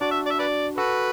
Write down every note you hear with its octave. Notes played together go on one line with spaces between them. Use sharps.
D4 F#4 D5
E5
D5
E5
B4 D5
F#4 A4 B4